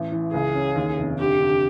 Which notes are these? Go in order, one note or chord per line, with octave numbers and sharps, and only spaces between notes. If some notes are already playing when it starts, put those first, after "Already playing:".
Already playing: A1
E3
C#2 G#4
C#4
D#2
F1
D3 G4
D3